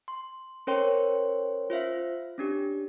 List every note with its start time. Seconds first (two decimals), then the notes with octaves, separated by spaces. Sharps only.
0.08 C6
0.67 C#4 A#4 C5 C#5 G5 C6
1.70 F4 C5 E5 F5
2.38 C#4 D4 G4